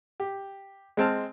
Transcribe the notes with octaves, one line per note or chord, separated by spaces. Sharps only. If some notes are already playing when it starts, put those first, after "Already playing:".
G4
G#3 C4 A5 F6